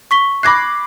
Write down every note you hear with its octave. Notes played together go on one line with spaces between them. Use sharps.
C#6 B6 G7
B5 D6 F#6 G#6 A#6 C7